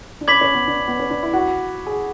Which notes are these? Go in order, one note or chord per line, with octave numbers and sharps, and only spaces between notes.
D4
C#4 B5 D6 G#6 B6 F#7
C#4
B3
D4
B3
C#4
D4
E4
F#4
G#4